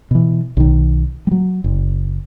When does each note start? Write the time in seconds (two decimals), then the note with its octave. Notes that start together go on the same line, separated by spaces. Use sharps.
0.11 B2 E3
0.57 B1 D#3
1.27 F#3 G3
1.64 F#1